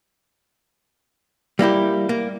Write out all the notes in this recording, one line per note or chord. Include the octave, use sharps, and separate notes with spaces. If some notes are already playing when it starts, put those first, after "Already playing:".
G3 A#3 E4 G4
A#3